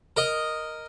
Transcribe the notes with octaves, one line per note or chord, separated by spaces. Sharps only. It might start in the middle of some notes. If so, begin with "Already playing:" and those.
A#4 D#5